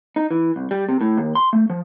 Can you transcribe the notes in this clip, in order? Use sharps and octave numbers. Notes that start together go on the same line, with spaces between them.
D#4
E3
C2
G3
C3
A2
D#2
C6
A3
F3